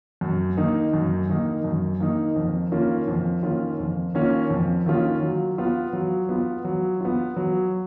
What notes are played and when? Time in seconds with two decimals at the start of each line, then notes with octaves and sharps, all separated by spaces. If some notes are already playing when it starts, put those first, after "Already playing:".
0.21 F#2
0.57 D#3 A#3 D#4
0.93 F#2
1.29 D#3 A#3 D#4
1.64 F#2
2.00 D#3 A#3 D#4
2.36 F2
2.71 D#3 A#3 C#4 F4
3.08 F2
3.43 D#3 A#3 C#4 F4
3.79 F2
4.14 D#3 A#3 C#4 F4
4.50 F2
4.86 D#3 A#3 C#4 F4
5.22 F#3
5.58 B3 F4
5.93 F#3
6.29 B3 F4
6.65 F#3
7.01 B3 F4
7.36 F#3